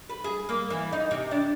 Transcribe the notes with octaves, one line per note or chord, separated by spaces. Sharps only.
B4
G#4
A#3
E3
D#4
C3
D4